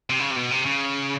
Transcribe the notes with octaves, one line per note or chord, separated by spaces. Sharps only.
C3
C#3
C3
B2
C3
C#3